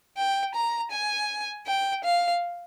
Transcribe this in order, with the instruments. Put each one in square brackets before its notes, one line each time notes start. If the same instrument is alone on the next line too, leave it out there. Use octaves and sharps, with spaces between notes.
[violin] G5
A#5
G#5
G5
F5